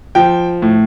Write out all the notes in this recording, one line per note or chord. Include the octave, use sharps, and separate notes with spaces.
F3 G5
A2